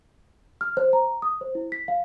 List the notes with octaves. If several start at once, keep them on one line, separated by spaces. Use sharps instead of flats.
F6
C5
A#5
D#6
C5
E4
B6
F5